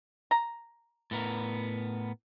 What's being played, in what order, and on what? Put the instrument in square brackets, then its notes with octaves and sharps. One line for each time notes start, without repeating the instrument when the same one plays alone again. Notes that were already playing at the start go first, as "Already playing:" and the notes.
[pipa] A#5
[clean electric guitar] A2 B3 A#4